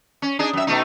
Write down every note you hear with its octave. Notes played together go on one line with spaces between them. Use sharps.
C#4
D4 D#4 G#4
F#2 E5
B2 A3 D#4